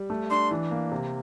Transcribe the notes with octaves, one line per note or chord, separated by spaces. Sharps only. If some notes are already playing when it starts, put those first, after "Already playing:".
Already playing: G3
A3
D4 C6
E3
A#3
C3